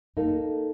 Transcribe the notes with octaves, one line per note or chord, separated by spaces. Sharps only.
A#3 D#4 A4